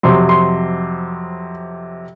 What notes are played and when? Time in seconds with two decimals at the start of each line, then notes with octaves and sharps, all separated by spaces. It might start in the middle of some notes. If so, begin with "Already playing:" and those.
0.03 F2 C3 F#3 C6
0.29 C6